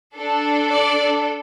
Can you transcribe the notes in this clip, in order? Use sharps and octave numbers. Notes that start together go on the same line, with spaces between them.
D4 A4
D5